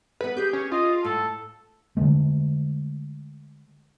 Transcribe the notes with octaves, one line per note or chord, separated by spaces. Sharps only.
B3 A4 B4
G4 G#4 B4 G6
C#4
F4 D#5
A2 A4
D3 D#3 G#3 A3